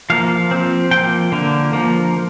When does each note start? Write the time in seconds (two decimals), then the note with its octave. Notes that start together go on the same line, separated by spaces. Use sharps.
0.10 F3 A#3 F5
0.51 F3 C4
0.91 F3 A#3 G5
1.32 D3 A#3
1.73 F3 A#3